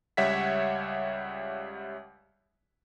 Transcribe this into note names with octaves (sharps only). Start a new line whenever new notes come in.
C#2 G3 C#5 E5 F#5 B6